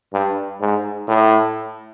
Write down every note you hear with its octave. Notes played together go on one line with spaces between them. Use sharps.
G2
G#2
A2